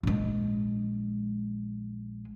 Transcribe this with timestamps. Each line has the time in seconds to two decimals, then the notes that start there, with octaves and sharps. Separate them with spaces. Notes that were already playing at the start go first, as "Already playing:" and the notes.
0.03 A#1 G#3